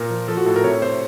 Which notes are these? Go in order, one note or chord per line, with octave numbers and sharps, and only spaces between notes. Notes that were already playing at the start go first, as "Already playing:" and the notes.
Already playing: A#2 A#4
F3
F3 A4
F#4
A2 A4
A#4
C3 C#5
C3 C5